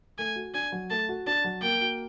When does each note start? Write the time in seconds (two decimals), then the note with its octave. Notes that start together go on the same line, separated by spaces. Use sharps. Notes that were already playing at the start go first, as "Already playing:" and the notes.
0.18 A3 G#5
0.36 F#4
0.54 D4 G#5
0.72 F#3
0.91 A3 A5
1.09 F#4
1.27 D4 A5
1.44 F#3
1.62 A#3 G5
1.81 F#4